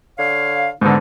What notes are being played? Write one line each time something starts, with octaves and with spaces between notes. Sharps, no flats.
D3 C#5 F5
G#2 D3 B3 D#4